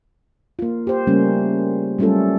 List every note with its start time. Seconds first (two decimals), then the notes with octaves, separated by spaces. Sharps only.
0.59 A#3 F4
0.87 G4 C5
1.07 C#3 G3 A3 A#3 C#4
1.99 F#3 G3 A3 C#4 F4 A4